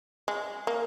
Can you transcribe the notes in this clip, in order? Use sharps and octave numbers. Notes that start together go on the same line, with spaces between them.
G#3
A#3